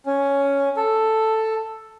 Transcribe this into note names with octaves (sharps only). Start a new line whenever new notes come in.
C#4
A4